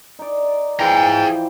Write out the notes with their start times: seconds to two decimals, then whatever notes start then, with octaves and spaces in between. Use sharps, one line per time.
0.19 D#4 D5
0.80 E3 F3 G#4 G5 A#5